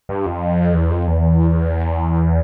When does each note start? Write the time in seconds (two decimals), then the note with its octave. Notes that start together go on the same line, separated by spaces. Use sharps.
0.09 G2
0.26 F2
0.74 E2
0.90 F2
1.07 E2